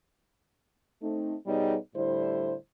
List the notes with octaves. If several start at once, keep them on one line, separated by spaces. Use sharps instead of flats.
A3 C4 D#4
B2 G3 B3 D#4 G#4 C#5
A2 D3 G3 E4 C5